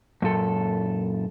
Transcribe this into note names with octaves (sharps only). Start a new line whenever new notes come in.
F#2 A#2 A4